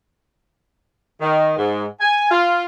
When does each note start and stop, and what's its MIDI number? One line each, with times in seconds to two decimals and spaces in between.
1.21 1.54 51
1.57 1.85 44
2.00 2.28 80
2.31 2.65 65